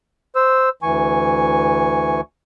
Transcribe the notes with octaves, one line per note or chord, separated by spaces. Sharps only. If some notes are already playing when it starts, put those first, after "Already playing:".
C5 E6
D2 E3 G#5 C#6